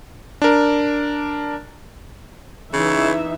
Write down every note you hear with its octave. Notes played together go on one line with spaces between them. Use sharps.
D4 A#4
C#3 E3 D#4 E5